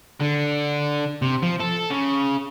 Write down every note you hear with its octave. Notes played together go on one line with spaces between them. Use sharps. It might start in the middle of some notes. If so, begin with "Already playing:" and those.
D3
C3
F3
A4
C#3